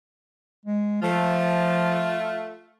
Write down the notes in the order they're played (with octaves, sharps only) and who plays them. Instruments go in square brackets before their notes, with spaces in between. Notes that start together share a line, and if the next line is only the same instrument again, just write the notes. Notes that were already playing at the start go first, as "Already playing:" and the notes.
[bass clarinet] G#3
[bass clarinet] F3 [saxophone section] A3 F4